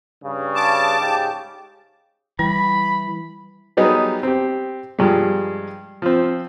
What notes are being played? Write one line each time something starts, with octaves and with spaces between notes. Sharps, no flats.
G2 C#3
A5 D6
G#2 C#3 G4
E3 G3 B5
F#3 G3 B3 D#4 G4 G#4
C4 G4
G2 F3 G3 G#3
F3 C4